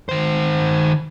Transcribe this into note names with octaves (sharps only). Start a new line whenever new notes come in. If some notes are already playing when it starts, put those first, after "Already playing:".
D#3 C5